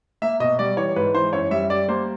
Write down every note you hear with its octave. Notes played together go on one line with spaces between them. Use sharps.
A#3 E5
B2 D#5
G3 D5
E3 C#5
G#2 B4
E3 C5
F#2 C#5
G3 E5
G3 D5
A#3 C5